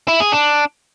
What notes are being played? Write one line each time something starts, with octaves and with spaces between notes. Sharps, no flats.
E4
G#4
D4